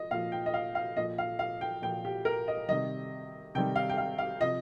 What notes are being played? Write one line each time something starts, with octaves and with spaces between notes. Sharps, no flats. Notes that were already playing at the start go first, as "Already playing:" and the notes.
Already playing: F3 D#5
A#2 F3 F5
G5
D#5
F5
F5
A#2 F3 D#5
F5
F5
G5
A#2 F3 G5
G4
A#4
D#5
C3 D#3 G3 D#5
C3 D#3 G3 G5
F5
G5
F5
F5
C3 F3 D#5